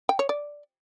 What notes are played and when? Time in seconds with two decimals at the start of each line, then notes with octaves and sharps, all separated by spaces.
0.09 G5
0.19 C#5
0.29 D5